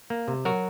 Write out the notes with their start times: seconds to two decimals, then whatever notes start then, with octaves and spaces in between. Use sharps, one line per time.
0.10 A#3
0.28 C3
0.45 F#3 F#4 A#4